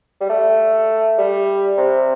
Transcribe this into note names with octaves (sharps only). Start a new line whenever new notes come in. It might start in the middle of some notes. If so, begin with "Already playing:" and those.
G3
A3
G3
C3